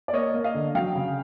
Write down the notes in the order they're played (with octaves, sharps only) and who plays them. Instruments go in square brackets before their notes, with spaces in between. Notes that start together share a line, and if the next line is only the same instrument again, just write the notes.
[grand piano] D5
A#3 C#5 D#5
A#3
D#5 F5
D3
F#3 F5 G5
C#3